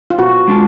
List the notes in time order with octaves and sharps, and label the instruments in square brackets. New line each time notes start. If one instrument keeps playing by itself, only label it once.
[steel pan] F4
[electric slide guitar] B2 [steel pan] F#4
[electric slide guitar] G#3 D4 F4